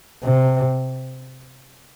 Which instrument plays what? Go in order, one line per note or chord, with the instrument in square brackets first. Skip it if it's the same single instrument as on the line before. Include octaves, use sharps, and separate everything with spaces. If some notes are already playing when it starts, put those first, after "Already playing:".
[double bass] C3